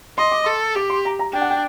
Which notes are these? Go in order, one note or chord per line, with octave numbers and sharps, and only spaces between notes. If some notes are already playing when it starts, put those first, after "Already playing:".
D#5 C6
D6
A4 C6
G4 D6
C6
A#5
A#5
D4 G5
F#5
G5